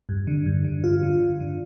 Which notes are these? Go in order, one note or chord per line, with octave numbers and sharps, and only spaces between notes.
G2
D3
G2
D3
G2 F4
D3
G2
D3